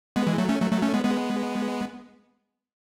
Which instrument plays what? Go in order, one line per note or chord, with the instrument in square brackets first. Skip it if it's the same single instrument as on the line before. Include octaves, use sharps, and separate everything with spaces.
[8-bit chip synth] G#3 B3
E3 G#3
F#3 A3
A3 C#4
F#3 A3
F#3 A3
A3 C#4
G#3 B3
G#3 B3